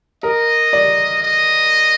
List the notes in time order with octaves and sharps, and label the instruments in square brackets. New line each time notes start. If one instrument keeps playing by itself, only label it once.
[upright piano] A#4 [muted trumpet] D#5
[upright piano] D5
[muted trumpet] D#5